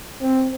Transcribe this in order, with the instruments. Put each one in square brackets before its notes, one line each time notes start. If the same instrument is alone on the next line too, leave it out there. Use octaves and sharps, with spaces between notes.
[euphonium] C4